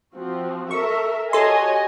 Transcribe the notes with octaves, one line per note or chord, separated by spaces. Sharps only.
F3 C4 F#4
A4 A#4 E5 C#6
F#4 G4 A4 C#5 D#5 G#5 C6